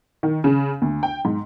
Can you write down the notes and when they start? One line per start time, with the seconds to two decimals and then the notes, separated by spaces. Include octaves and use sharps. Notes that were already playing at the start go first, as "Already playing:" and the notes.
0.23 D#3
0.44 C#3
0.82 D2
1.03 G5
1.25 G#2